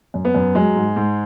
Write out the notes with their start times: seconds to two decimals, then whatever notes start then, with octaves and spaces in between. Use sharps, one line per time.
0.14 F#2
0.25 B3
0.34 F#2
0.55 F#3 G#3
0.75 G#2
0.96 G#2